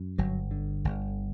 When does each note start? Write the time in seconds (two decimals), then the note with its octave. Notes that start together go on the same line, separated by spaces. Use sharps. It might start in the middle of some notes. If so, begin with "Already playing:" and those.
Already playing: F#2
0.18 G1 F#3
0.51 D3
0.85 G1